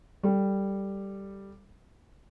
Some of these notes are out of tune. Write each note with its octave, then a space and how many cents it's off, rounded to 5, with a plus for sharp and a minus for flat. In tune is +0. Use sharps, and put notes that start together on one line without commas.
G3 +0 A4 +0